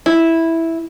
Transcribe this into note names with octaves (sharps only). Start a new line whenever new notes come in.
E4